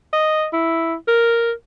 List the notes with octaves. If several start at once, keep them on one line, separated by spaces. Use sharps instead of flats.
D#5
E4
A#4